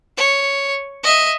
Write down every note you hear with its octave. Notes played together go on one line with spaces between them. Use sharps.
C#5
D#5 E5